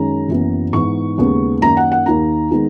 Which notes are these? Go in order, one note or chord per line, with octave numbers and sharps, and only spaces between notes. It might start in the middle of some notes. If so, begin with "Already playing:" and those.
Already playing: F#2 D#3 G#3 C#4 A#5
F#1 F#2 C#3 E3 B3
G#2 E3 B3 D#4 C#6
D#2 C#3 G#3 B3 D#4
F#2 D#3 A#3 D#4 A#5
F#5
F#5
D#2 D#3 A#3 D#4 A#5
D#3 G#3 B3 D#4